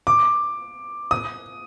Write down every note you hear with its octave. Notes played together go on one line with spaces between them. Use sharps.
D6
D#6